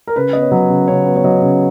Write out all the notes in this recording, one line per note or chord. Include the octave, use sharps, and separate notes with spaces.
A#4
C#3 B4
B3 D#5
C#5
F#3 B4
C#3
C#3 C#5
B3
C#5
F#3 D#5
C#3